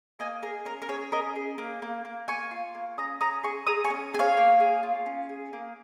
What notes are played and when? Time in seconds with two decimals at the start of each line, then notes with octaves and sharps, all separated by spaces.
0.19 A#3 D#5 G#5
0.42 G#4 A#4
0.65 C#4 A#4
0.82 A#4
0.88 G#4 C#5
1.12 C#4 A#4 D#5
1.36 G#4
1.58 A#3
1.82 A#3
2.05 A#3
2.28 A#3 G#5 C#6
2.51 F4
2.75 A#3
2.98 C#4 A#5 D#6
3.21 C#4 A#5 D#6
3.43 G#4 G#5 C#6
3.67 G#4 A#5 D#6
3.84 G#5 C#6
3.90 C#4
4.13 G#4 G#5
4.19 C#5 F5
4.37 A#3
4.60 G#4
4.83 F4
5.06 C#4
5.29 G#4
5.53 A#3